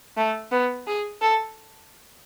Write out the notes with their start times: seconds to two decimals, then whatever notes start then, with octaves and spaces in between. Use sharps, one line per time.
0.17 A3
0.51 B3
0.87 G#4
1.21 A4